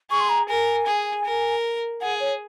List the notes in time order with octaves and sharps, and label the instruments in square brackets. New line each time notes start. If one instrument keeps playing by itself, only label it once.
[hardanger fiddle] G#4 [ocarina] C#6
[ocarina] C6
A#5
[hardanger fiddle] A#4 [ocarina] G#5
[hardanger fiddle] G#4
A#4
[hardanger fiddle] G#4 [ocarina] F#5
[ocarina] C#5